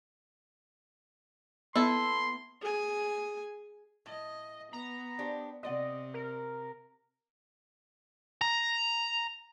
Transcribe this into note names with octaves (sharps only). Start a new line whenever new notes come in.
B3 E4 A4 C6
G#4 G#5
A2 D#5
B3 A#5
D4 G4 C5
C3 C4 D5 D#5 F#5
A#4
A#5